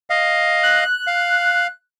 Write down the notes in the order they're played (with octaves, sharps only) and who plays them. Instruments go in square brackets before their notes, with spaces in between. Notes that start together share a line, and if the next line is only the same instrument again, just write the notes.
[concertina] D#5 F5
[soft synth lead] F#6
[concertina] F5